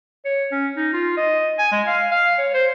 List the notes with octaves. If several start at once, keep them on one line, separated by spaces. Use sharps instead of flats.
C#5
C#4
D#4
F4
D#5
G#5
G#3
F5
F5
C#5
C5